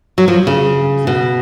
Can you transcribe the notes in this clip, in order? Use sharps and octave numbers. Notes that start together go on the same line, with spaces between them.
F#3
F3
C#3
B2